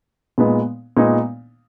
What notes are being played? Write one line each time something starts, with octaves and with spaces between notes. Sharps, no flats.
A#2 G#3 B3 D#4
A#2 G#3 B3 D#4